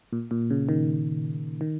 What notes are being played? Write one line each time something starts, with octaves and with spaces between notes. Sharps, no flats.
A#2
A#2
C#3
D#3
D#3